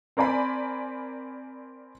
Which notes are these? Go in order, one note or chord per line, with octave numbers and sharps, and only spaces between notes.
C4 A#4 D5 G#5 B5